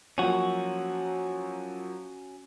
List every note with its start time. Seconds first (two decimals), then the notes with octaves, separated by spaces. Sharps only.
0.18 F3 F#3 A#3 C#4 F#4